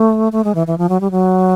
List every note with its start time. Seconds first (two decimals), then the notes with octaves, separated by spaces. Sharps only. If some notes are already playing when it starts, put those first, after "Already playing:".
Already playing: A3
0.32 A3
0.44 G#3
0.55 E3
0.67 E3
0.78 F3
0.89 F#3
1.01 G3
1.11 F#3